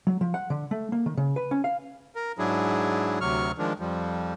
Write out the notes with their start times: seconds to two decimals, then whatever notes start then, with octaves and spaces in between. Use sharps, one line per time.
0.07 F#3
0.21 F3
0.34 F#5
0.50 D3
0.71 A3
0.92 A#3
1.06 D#3
1.17 C#3
1.36 B4
1.51 C#4
1.64 F5
2.15 A#4
2.39 G#2 F#3 D4 E4 G#4
3.21 D2 C3 F#3 C#6 F6
3.58 D#3 F3 G#3 D4
3.80 F2 F3 G3